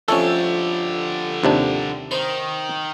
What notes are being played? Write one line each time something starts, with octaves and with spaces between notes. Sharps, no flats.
F2 D3 A3 C#4 G4 A4 C#5
D#2 C3 D4
D#3 C5